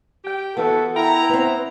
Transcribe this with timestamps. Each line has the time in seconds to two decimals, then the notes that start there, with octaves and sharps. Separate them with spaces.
0.24 G4 G5
0.57 E3 B3 F#4 A4
0.95 E4 G5 A#5
1.29 B3 C4